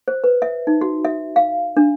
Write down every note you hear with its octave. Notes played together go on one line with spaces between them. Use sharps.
C5
B4
E5
D#4
F#4
E5
F5
D4